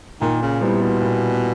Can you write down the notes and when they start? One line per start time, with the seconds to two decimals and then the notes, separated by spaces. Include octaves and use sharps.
0.21 A#2 D#3
0.42 C#3
0.62 C3 G3 B3 E4
0.82 B2
1.02 A#2